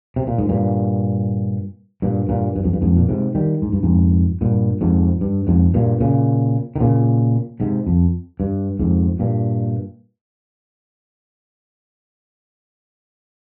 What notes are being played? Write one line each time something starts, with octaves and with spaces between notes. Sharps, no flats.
C3
A#2
G#2
G2 A#2
G2 A#2
G2 A#2
G2
F2
G2
F2 G#2
A#2
G#2 C3
D#3 G3
G#2
G2
F2 G#2
G2 A#2
F2 G#2
G2
F2 G#2
G2 A#2
A#2 C#3
D#3
A#2 C#3
G#2 C3
F2
G2
F2 G#2
G2 A#2